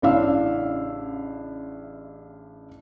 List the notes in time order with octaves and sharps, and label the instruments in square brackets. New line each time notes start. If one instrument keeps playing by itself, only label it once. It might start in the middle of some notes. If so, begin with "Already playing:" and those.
[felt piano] A1 C#3 D4 E4 F5 E6